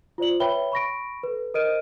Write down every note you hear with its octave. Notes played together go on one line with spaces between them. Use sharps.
F4 C5 D5 F#7
B4 C#5 E5 G5 B5 G7
B5 C#6 A#6 D7
A4 B4
A#4 C5 D#5 F6 D7 D#7